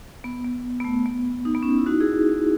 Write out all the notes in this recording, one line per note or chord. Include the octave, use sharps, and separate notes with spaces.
B3
B3
B3
A3
B3
D#4
B3
C#4
D#4
E4
D#4 F#4
E4 G#4